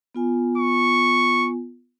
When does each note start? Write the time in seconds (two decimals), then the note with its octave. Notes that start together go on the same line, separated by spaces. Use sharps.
0.15 B3 F4 G#5
0.58 C#6